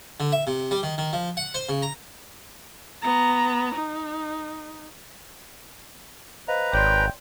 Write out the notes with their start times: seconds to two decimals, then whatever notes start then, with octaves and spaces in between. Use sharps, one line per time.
0.20 D3
0.32 E5
0.47 C3
0.71 G3
0.83 D#3
0.98 D#3
1.13 F3
1.37 F#5
1.54 C5
1.69 C#3
1.82 A#5
3.02 B3 A#5
3.75 D#4
6.48 B4 C5 D#5 F5 A#5
6.73 G#1 C#5 D5 G5 C6